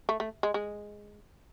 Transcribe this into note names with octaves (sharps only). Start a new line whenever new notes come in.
A3
A3
G#3
G#3